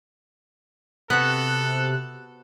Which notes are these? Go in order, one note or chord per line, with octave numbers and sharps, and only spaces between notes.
C3 B3 F#4 A4 F#6